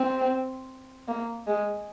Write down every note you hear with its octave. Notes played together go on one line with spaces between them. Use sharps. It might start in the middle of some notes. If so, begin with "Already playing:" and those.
Already playing: C4
A#3
G#3